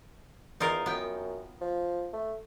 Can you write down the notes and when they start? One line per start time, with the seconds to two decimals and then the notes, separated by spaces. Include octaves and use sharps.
0.60 E2 D#4 F4 A#4
0.86 F#2 B3 G5
1.61 F3
2.13 A3